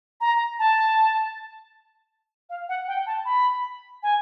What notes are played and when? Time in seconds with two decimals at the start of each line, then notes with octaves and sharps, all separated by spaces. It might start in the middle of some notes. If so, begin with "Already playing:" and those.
0.21 A#5
0.59 A5
2.50 F5
2.69 F#5
2.87 G5
3.06 A5
3.25 B5
4.03 G#5